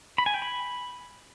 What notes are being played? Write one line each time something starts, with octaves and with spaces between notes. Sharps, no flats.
B5
G#5
G5
B5